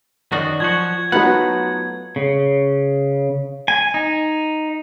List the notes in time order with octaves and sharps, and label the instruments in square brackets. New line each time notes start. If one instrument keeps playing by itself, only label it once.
[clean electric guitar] F#2 D#3 F#4 [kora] D5
[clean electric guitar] F3 F#4 [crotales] G#6
[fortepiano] F#3 D#4 F4 [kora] A3 B3 [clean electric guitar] F#5
[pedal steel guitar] C#3
G#5
D#4